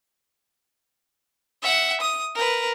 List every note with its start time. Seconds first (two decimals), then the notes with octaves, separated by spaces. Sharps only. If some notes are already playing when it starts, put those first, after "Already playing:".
1.63 E5 F#5
2.01 D#6
2.35 A#4 B4